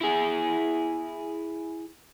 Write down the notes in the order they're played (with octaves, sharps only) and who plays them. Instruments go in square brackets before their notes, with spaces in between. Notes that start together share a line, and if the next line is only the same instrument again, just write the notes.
[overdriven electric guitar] E4 G#4